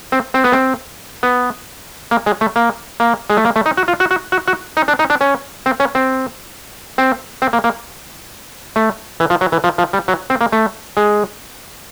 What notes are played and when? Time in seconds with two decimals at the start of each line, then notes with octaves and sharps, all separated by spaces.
0.12 C4
0.34 C4
0.44 B3
0.52 C4
1.23 B3
2.11 A#3
2.26 G#3
2.41 A3
2.56 A#3
3.00 A#3
3.30 G#3
3.37 A3
3.45 A#3
3.56 A3
3.66 D#4
3.77 F#4
3.88 F4
4.00 F#4
4.11 F#4
4.32 F#4
4.48 F#4
4.77 D#4
4.88 D4
4.99 D#4
5.10 D4
5.21 C#4
5.66 C4
5.80 C#4
5.95 C4
6.98 C4
7.42 C4
7.53 A#3
7.64 A#3
8.76 A3
9.20 E3
9.30 F3
9.41 F#3
9.52 E3
9.64 F3
9.78 F3
9.93 G3
10.08 F#3
10.30 C4
10.41 A#3
10.52 A3
10.97 G#3